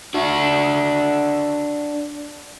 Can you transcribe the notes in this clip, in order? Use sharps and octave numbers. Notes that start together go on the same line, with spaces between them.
D4 F#4